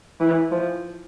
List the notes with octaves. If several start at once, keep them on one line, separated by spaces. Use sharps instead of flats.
E3
F3